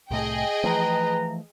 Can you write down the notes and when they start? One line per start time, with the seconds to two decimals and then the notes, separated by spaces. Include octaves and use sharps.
0.11 C2 A2 A3 G#4 D#5 G5
0.64 E3 F3 A3 B4 A#5